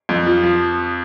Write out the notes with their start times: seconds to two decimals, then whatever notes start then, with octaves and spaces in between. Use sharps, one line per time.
0.09 F2
0.27 F3
0.43 F3